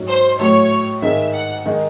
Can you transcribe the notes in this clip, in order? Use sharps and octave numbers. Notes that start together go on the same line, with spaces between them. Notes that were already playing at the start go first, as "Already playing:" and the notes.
Already playing: G#2 F#3 C#4
C5
A2 F#3 A3 C#5
G#2 D#3 G#3 E5
F#5
D#3 G#3 D#4